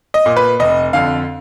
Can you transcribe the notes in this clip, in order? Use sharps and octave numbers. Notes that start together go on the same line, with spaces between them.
D#5
A#2
B4
F1 D#5
F2 D3 F5